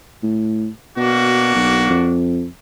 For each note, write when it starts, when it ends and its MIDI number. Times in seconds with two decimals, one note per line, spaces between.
0.23 0.68 45
0.97 1.50 47
0.97 2.16 58
0.97 2.16 62
0.97 2.16 66
1.55 1.89 35
1.89 2.47 41